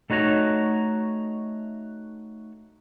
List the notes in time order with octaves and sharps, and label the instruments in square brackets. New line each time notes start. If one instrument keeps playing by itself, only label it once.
[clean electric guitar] A3 D#4 F#4 C#5 A#5